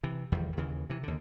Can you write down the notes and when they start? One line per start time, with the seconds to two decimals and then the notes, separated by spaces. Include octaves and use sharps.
0.03 C3 E3
0.32 F1 E2 D#3 G3
0.57 D#2 C#3 E3
0.90 C3 E3
1.03 D#2 D3